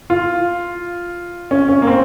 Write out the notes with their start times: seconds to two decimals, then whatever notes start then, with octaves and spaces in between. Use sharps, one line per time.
0.10 F4
1.51 C#4
1.69 C#4
1.82 A#3
1.87 C4